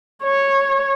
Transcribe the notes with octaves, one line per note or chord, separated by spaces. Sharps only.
C#5